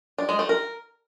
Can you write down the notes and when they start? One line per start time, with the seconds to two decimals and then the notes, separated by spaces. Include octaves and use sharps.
0.18 D4
0.29 G#3
0.39 A3
0.49 A#4